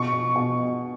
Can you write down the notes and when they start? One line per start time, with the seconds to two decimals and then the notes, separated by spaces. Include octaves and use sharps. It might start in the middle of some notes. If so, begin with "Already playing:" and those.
Already playing: B2 C#6
0.12 B2
0.36 B2